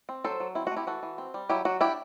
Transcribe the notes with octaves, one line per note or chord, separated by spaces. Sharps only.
C4
F#3 A4 C5
F#3
C4 E4
F#4
A3
E4 G4
E3 F#4 A4
E3
C4
G3
F#3 E4 G4
F#3 F#4
D4 E4 G4